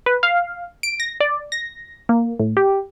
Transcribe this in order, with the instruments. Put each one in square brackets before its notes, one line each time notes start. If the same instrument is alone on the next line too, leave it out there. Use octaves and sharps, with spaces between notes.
[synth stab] B4
F5
D7
A#6
D5
A#6
A#3
A2
G4